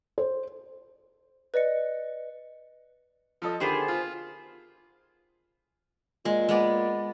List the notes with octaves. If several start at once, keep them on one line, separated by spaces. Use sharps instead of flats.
C5
B4 D5 D#5 C#7
F3 A4 D#5
D3 D#3 B3 G4 G#4 C5
F4
A#2 G#3
G#3 B3 D5